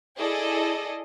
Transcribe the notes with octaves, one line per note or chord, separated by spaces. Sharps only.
E4 G#4 A4 D5 D#5